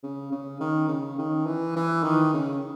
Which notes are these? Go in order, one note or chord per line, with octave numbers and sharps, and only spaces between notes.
C#3
C#3
D#3
C#3
D#3
E3
E3
D#3
C#3